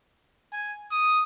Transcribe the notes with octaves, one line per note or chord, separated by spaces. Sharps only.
G#5
D#6